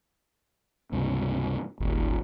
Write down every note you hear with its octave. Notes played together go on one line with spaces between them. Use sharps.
C#2 G2 C3
D#1 G#1